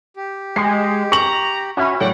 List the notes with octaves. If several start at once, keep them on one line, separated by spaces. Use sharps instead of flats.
G4
G#3 C7
A#5 C#6 F#7
C#4 F#4 E5 B5
A2 F#3 D5 F#5 G5